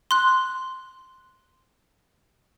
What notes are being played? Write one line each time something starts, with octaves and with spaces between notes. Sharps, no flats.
C6 F#6